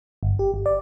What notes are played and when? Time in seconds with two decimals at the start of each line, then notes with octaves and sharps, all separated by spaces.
0.23 G1
0.39 G4
0.54 G1
0.66 D5